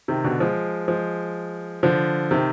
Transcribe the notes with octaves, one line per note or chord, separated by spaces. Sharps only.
C3 D#3
B2 D3
F3 G#3
F3 G#3
D3 F3
C3 D#3